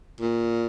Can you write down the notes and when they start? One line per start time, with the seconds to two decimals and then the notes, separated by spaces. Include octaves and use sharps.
0.21 A#2